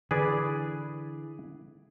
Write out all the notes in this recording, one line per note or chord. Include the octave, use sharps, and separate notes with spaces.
D3 E3 G#4 B4 D5